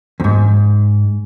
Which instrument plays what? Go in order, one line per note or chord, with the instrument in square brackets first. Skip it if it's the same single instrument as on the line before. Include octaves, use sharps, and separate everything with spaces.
[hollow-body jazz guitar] E2 G#2